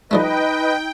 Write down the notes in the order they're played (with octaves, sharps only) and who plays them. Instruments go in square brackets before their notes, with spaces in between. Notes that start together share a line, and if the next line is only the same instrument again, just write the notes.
[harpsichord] F3 G3 A3 [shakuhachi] D#4 [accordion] B4 D#5 [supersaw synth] G5